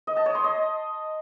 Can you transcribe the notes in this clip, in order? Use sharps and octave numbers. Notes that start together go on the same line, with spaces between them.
D#5
A5
C#5
C6
D#5